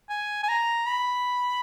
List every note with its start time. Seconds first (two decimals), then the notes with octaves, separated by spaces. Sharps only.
0.10 G#5
0.43 G#5
0.49 A#5
0.86 B5